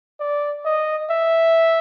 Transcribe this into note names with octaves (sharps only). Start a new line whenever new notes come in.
D5
D#5
E5